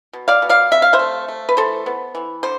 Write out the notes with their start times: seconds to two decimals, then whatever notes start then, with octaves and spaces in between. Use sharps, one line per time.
0.13 B2
0.28 D5 F5
0.42 B2
0.49 D5 F5
0.71 C3 E5
0.82 F5
0.93 C5 E5
0.99 A3
1.28 A3
1.49 B4
1.57 E3 A4 C5
1.86 B3
2.15 E3
2.43 D3 C5